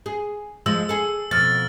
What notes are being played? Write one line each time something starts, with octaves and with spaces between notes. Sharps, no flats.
G#4
F3 G#3 E6
G#4 A4
F2 B2 F6 A6